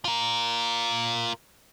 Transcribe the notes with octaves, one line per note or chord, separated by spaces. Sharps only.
F4 A#4